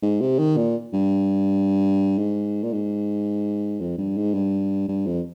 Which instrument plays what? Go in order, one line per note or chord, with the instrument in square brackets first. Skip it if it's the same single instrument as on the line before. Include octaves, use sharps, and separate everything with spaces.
[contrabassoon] G#2
C3
D#3
A#2
G2
G#2
A#2
G#2
F2
G2
G#2
G2
G2
F2